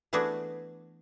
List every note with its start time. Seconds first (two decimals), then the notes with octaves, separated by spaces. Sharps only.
0.13 E3 A3 B3 D4 F#4 G#4